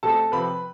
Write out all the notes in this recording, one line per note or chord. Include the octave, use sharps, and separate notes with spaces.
B2 A3 C4 A4 A5
C3 F3 C4 B4 B5